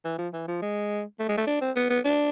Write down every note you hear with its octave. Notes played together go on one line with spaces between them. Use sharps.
E3
F3
E3
F3
G#3
A3
G#3
A3
D4
C4
B3
B3
D4